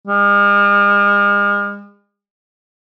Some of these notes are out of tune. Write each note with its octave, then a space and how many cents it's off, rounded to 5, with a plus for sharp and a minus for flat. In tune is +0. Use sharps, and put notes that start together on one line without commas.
G#3 -45